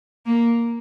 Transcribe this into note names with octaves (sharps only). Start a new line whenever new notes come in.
A#3